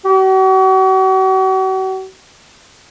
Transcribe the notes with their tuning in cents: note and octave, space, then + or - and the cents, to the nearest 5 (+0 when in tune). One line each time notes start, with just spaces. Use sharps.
F#4 +40